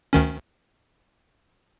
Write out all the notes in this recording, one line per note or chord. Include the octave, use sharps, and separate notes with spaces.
D2 D#3 C#4